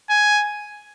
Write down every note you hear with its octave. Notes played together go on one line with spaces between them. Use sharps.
G#5